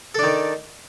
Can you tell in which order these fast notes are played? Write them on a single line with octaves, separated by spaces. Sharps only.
A4 D4 D#3